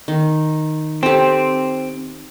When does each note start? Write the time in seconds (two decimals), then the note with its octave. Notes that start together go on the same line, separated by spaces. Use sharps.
0.08 D#3
1.03 C4 G4 A4